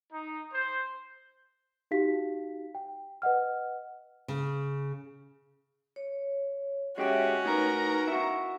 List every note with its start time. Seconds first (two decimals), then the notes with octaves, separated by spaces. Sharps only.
0.12 D#4
0.53 C5
1.91 D#4 F#4 G4 F5 B6
2.75 G5
3.22 B4 D#5 F#5 F6
4.28 C#3
5.96 C#5
6.98 G#3 C#4 F#4 G4 C#5 E5
7.45 A2 D#4 A#4 B4 A#5
8.08 E4 F#4